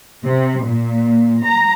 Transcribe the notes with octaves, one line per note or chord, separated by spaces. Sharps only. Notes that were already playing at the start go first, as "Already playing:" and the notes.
C3
A#2
A#5